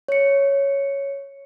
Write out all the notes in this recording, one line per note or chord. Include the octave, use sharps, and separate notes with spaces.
C#5 C#7